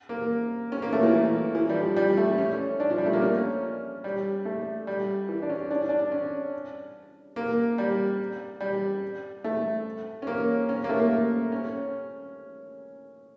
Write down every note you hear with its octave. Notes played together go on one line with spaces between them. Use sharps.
A#3
C#4
A#3
A3
E3
E3
E3
G3
F3
G3
A3
C#4
D4
F3
G3
A3
A#3
C#4
G3
A3
G3
E3
D4
C#4
D4
D4
C#4
A#3
G3
G3
A3
C#4
A#3
C#4
A#3
A3
A#3
C#4